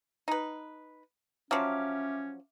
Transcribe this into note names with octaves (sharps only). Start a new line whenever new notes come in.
D#4 B4
F3 F#3 C#4 E5 D6 F6